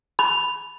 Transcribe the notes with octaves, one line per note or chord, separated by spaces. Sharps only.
B5